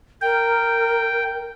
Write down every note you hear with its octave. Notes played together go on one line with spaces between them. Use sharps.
A#4 G5